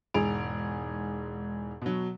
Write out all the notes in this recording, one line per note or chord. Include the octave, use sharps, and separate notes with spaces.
E1 G#2 G#4 D7 F7
B2 F#3